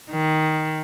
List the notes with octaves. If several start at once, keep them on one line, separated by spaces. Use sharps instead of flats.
D#3